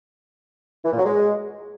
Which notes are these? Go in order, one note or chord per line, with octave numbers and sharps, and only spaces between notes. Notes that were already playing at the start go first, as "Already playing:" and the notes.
E3
A#2
F#3
G#3